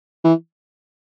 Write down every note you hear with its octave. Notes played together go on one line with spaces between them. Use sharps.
E3